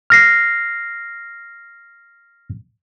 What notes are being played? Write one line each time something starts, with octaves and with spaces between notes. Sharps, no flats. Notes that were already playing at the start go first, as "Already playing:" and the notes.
F6 A#6 C7